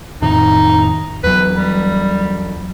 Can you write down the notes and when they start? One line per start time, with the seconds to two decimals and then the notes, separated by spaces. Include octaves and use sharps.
0.22 F2 A2 D#3 D#4
1.24 E2 F#3 B4
1.54 G3